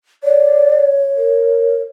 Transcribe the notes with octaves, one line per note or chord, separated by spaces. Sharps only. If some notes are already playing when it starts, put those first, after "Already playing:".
C#5 D5
A#4